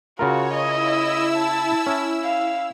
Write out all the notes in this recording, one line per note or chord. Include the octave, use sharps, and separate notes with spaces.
C#3 F4 F#4 A#4 C#5
E4 D#5 E6
A5
C#4
F5